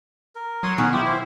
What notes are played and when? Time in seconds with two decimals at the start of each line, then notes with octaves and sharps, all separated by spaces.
0.35 A#4
0.63 F#3 C#5 C6 D#6
0.78 B2 D#3 C#4 F#4 G#4
0.93 E4 F4 G4
1.06 C5